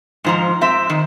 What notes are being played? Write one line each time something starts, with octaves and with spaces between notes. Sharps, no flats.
G#2 F3 A#5
C4 E5
D#3